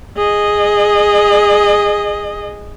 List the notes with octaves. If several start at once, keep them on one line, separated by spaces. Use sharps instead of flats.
G#4 D#5